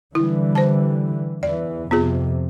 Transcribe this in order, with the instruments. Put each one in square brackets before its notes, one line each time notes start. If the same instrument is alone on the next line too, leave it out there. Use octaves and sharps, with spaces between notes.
[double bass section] D3 E3 G3 [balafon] E4
[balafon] C5 A5
[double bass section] E2 E3 [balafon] D5
[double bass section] F2 C3 [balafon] B3 F4 G#4